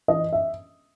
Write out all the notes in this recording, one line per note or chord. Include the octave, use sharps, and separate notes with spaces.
E3 D#5
E5